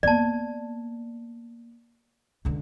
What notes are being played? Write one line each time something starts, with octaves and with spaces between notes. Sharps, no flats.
A#3 B3 D5 A5
C#2 D3